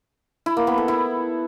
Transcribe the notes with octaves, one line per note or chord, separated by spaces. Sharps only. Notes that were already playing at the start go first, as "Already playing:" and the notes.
E4
A#3
B3
A4
E4